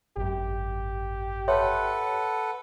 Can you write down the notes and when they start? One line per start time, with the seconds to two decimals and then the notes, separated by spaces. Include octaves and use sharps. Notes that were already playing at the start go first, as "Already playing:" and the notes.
0.17 G#1 F#2 G4
1.48 A4 B4 C#5 E5 F#5 C6